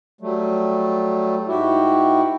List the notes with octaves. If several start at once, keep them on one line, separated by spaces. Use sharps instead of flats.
F#3 G3 A3
G#2 E4 F#4 G4